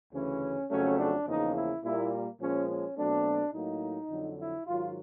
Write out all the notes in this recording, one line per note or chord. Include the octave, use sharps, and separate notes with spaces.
D2 C#3 E3 C#4
F2 C#3 F#3 A3 C#4
D4
E2 C#3 F3 A#3 D#4
E4
A#2 G3 A#3 E4
A#2 F3 G#3 C#4
C#4
B2 F#3 A3 C4 D4
A2 F#3 A#3 D#4
F2 D3 F#3
E4
G#2 D#3 F#3 F4